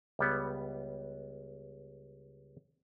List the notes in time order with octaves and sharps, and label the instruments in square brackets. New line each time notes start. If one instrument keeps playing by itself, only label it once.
[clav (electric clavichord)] C#2 G3 B3